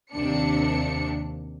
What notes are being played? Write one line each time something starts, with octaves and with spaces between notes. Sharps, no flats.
D#2 C3 D4 C#7